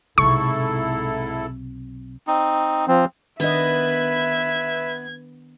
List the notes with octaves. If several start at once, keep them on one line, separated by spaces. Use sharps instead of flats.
B1 G#2 C3 E4 A4 C#6
C4 D#4
F3 C4
D#3 B3 D4 B4 D#5 E5 G#6